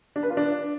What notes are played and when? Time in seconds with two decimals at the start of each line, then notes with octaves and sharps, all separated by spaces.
0.16 D4
0.23 B4
0.30 F4
0.37 D4